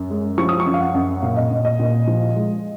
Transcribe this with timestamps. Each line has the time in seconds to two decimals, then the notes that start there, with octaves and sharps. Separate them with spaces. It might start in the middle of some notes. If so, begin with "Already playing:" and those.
Already playing: F#2
0.10 G#3
0.38 F3 C#6
0.49 D#6
0.60 C#6
0.66 F#2
0.74 F5
0.80 F#5
0.94 F#2
1.23 A#2 F5
1.36 D#5
1.51 A#2
1.65 D#5
1.79 A#2
2.07 F3
2.36 G#3